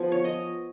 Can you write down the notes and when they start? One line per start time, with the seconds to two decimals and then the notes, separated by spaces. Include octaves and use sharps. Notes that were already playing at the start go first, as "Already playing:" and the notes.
Already playing: F3 B3 G#5
0.12 C#5
0.24 D#5